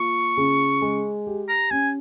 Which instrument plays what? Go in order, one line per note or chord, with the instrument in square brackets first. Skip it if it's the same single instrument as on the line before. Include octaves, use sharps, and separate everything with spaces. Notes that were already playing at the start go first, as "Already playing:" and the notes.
Already playing: [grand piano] A#3 F4 [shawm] C#6
[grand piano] C#3
G#3
G4
[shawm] A#5
[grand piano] C#4 [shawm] G#5